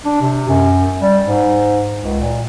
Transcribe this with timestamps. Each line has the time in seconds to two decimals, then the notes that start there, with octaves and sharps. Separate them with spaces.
0.05 D4
0.21 C3
0.49 F#2
1.01 G3
1.26 G#2
2.03 C#2
2.20 A#2